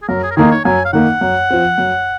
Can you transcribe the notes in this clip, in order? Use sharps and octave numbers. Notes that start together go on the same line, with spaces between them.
G#4
F#2 A#4
G#4
A#4
D#3 A#3 D#4 G#4
C#5
F#2 G#5
F5
D#3 A#3 D#4 F#5
F#2
F3 C4
F#2